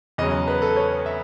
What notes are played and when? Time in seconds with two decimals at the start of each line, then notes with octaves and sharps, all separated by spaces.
0.18 E2 C#3 F#3 D#5
0.47 B4
0.62 A4
0.76 C#5
1.06 E5